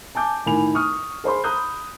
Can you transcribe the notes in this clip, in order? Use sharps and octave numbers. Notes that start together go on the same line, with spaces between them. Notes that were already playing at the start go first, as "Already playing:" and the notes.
G#5 A5 D6 G6
A2 D#3 G#5 B5 F7
C#6 D#6 F6
G#4 C5 B5 C6
A#5 B5 D#6 F#6 G6